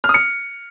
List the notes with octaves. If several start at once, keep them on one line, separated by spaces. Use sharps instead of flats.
F6
D#6
C#7